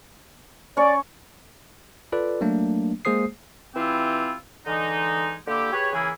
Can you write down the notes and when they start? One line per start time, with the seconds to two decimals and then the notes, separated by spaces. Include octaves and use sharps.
0.77 C#4 D5 C#6
2.12 F4 A4 B4 D5
2.41 F#3 A3 A#3 D4
3.05 G#3 A#3 G#4 C5 D#6 C7
3.75 E3 C4 E4 F4 G4
4.67 D3 E3 G#3 D#4
5.47 D3 A#3 E4 G4
5.73 G4 G#4 B4 C#5
5.93 C#3 E3 A#3 E4 G#4